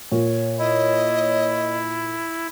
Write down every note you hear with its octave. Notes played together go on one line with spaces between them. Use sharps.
A#2 C#5
E4 D#5